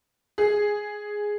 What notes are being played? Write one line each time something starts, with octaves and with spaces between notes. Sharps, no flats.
G#4